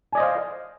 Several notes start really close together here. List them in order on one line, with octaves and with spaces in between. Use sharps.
G#5 D5 D#5 C5 F5